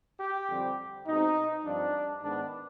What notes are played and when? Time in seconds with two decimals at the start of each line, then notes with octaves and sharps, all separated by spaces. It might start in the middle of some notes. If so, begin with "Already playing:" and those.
0.20 G4
0.49 F2 D3 G3 C4
1.07 B2 G#3 C4 D#4
1.65 G2 F3 C4 D4
2.23 G#2 D#3 B3 D4